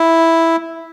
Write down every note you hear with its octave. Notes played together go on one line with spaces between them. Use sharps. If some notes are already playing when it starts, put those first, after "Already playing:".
Already playing: E4